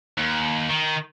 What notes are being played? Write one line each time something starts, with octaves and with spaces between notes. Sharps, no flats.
D#2
D#3